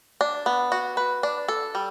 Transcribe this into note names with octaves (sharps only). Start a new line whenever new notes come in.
D4
B3
F#4
B4
D4
A4
G3